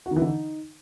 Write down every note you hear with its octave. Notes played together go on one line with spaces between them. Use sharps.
F#4
D#3
E3
D3
D#4